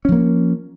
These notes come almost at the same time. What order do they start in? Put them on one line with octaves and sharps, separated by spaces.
C#4 F3 A#3